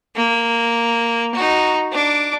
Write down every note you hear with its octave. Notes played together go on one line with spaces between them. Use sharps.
A#3
D#4 F#4
D4 D6